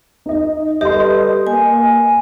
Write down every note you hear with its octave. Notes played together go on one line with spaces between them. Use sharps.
D#4 D#5
G3 G4 A4 B4 D#5 C6
A#3 G#5